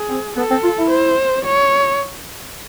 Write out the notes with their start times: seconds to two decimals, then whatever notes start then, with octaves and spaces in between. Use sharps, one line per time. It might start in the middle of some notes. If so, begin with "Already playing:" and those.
Already playing: G#4
0.09 C4
0.36 B3 A4
0.50 C4
0.63 F4
0.78 E4
0.90 C5
1.45 C#5